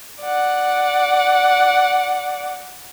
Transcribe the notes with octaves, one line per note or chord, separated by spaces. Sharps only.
D5 F#5